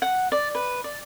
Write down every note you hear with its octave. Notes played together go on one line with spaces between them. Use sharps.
F#5
D5
B4
D5